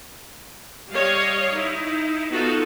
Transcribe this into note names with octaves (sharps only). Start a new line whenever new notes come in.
G3 C#5 D#5 F5
D#4 E4
B3 D#4 F4 F#4 A4